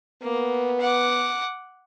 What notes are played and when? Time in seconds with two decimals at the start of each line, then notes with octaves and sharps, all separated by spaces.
0.23 A#3 B3
0.80 F#5 D6